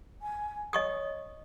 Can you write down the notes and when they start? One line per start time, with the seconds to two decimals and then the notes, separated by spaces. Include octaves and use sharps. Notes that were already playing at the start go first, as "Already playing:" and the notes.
0.21 G#5
0.73 C#5 D#5 C#6 D#6